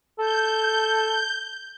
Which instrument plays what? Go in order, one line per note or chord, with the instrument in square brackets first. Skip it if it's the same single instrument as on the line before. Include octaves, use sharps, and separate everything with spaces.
[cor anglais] A4 [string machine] G6